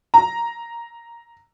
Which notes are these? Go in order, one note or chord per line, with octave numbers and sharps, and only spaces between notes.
A#5